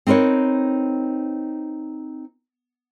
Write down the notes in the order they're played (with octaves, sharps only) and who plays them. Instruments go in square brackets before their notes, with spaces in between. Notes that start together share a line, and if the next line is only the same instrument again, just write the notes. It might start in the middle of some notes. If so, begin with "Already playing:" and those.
[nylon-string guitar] C4 D#4 A#4 B4 C#5